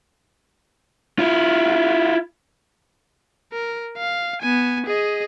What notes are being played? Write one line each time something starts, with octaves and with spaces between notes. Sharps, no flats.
E4 F4
A#4
F5
B3 G#5
G#4 D#5